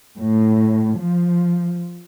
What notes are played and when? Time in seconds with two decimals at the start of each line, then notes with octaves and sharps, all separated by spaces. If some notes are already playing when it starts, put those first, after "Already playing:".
0.18 A2
0.98 F3